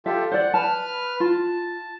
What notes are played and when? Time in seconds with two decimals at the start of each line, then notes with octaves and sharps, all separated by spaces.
0.06 F4 G4 A4 E5
0.32 C5 D5 F#5
0.54 B4 A5 F6
1.20 F4 A5